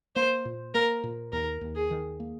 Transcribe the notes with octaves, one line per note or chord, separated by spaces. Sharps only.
A#3 C5
A#2
A#3 A#4
A#2
D#2 A#4
D#2
G#4
D#3
A#3